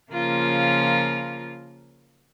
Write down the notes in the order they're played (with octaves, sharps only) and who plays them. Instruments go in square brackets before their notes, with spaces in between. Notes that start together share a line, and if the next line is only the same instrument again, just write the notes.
[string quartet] C#3 F3 A#3 F4 A#4